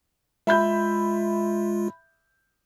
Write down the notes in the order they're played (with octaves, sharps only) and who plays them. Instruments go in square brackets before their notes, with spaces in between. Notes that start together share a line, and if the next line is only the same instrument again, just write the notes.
[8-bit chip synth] G#3 F4 [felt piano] E5 B5 G6